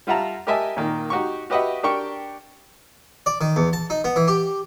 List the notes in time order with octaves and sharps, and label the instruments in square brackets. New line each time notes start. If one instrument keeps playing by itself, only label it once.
[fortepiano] G3 F4 E5 F#5 A5 A#5
G4 A#4 D#5 E5 G#5 A5
A#2 D#3 A#3
D#4 F#4 G4 C#6
F#4 G4 B4 D#5 E5 F#5
D4 G4 A#4 G5 C#6
[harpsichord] D5
D#3
E2
A5
D#4
B3
E3
G4